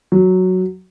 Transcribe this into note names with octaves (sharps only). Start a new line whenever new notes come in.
F#3